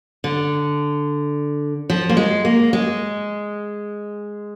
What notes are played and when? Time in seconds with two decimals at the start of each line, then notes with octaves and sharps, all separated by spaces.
0.24 D3
1.90 F3
2.09 A#3
2.17 G#3
2.45 A#3
2.73 G#3